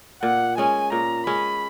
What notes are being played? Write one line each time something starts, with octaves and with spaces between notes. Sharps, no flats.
A#2 F#5
G#3 C#4 G#5
A#2 A#5
G#3 C#4 B5